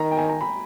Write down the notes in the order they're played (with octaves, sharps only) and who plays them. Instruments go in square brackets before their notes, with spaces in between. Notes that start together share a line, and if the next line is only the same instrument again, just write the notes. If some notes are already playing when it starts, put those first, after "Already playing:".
Already playing: [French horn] D#3 [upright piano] A#5
[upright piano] G5
G#5
A#5
B5